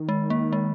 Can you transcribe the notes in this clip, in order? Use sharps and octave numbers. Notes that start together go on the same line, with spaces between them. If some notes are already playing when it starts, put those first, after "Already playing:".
Already playing: D#3
G#3
A#3
G#3